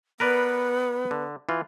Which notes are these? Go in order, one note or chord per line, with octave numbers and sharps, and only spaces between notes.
B3 A#4 B4 D5
D3
E3 F4